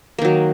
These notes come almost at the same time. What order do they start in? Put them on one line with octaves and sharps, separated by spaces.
A#3 D#3 F#3